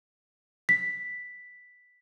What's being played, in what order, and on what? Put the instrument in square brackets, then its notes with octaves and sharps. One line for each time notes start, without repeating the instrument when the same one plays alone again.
[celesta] B6